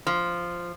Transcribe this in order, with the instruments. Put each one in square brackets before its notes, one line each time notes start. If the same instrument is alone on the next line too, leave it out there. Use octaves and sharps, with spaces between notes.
[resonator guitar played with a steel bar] F3